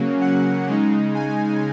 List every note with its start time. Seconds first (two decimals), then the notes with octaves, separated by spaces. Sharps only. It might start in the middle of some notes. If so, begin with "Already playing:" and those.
Already playing: C#3 F#3 A#3 C#4
0.21 F#5
0.67 C#3 G#3 D#4
1.14 G#5